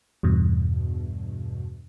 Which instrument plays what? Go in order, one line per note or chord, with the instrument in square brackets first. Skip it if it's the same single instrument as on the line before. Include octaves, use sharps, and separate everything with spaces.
[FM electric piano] E2 G2 B2